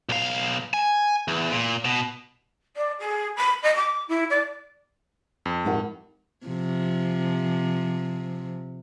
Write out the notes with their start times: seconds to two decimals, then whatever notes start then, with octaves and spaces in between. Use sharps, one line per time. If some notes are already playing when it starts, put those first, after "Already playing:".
0.09 B1 F5
0.74 G#5
1.28 E2
1.51 A#2
1.85 B2
2.77 D5
3.00 G#4
3.37 B5
3.63 D#5
3.76 D6
4.09 E4
4.30 D5
5.46 F2
5.65 A2 G#3 D#4 G4 A#4 F#5
6.46 C3 F3